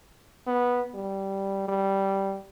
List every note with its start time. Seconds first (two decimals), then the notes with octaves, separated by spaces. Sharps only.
0.47 B3
0.95 G3
1.68 G3